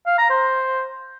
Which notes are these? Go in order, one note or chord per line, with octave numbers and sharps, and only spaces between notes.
F5
A#5
C5